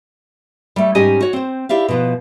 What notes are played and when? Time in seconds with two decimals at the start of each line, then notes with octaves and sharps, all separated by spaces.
0.76 G3 A3
0.95 G#2 G3 C#4 G4 D#5 G#5
1.21 F#4 C#5
1.33 C4 C5
1.69 E4 G4 D5 E5 F5
1.88 B2 F3 B3